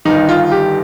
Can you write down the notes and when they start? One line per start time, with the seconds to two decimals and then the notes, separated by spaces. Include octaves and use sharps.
0.05 G1 G2 D#3 D#4
0.29 F4
0.52 G4